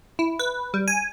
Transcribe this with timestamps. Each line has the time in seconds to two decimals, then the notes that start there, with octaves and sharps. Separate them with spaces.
0.19 E4
0.39 B4
0.74 G3
0.88 G#5